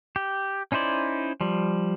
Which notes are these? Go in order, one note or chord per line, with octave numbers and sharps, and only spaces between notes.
G4
C#4 D#4 E4 C5 D5
F3 G3